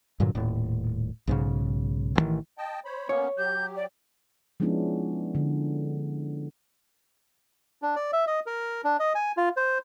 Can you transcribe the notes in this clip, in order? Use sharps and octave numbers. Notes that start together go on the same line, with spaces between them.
G2 A#2 D3 F#3
D#1 A2
B1 G#2 C#3
A1 G2 D#3 E3
D#5 G5 A5
C5 C#5 B5
A#3 B3 C#4 C#5
F#3 G4 G6
D5
F3 G#3 B3 C#4 D4 E4
D3
D4
D5
E5
D#5
A#4
D4
D#5
G#5
F4
C5